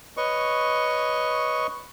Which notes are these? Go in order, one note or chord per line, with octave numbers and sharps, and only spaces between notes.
B4 C#5 D#5 C#6